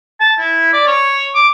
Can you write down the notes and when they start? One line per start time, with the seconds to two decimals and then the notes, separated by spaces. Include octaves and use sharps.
0.20 A5
0.39 E4
0.74 D5
0.87 C#5
1.35 D6